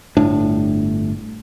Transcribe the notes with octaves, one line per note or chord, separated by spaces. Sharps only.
G1 A2 D4